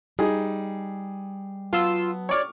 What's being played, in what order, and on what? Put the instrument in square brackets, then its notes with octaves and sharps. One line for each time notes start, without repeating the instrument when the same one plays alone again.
[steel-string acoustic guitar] G3 [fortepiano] D#4 G#4
[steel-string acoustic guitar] F#3 B3 A5 [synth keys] F4 C6 E6
[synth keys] C#5 D5 [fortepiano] C#6 D6 F6